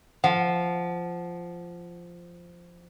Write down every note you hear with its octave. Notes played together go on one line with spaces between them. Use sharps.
F3 F#5